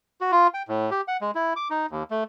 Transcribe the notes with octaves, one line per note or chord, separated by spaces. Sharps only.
F#4
F4
G5
A2
G4
F#5
G#3
E4
D6
D#4
D#2
A3